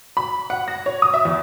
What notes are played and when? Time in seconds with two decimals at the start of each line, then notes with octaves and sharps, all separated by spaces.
0.17 B5
0.50 F#5
0.68 A#6
0.86 C#5
1.02 D#6
1.14 E5
1.25 E2